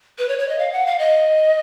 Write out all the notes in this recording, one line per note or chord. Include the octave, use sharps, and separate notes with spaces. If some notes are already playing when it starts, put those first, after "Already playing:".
B4
C#5
C#5
D#5
F5
F#5
F5
D#5